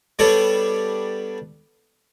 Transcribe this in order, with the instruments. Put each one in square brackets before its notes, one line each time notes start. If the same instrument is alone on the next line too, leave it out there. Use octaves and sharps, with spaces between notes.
[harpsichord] G3 B3 D4 A4 C#5